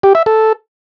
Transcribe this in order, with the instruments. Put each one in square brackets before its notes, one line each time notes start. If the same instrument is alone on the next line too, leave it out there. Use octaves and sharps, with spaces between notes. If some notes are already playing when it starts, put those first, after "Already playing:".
[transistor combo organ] G4
E5
A4